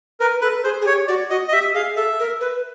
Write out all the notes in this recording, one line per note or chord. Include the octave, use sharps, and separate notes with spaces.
A#4 B4
A4 B4
G#4 C5
G#4
G4 C#5
F#4 D5
F#4 D#5
D#5
G4 E5
G#4 F5
A4 E5
A#4
B4